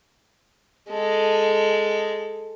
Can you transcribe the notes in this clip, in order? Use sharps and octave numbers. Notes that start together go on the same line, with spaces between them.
G#3 A4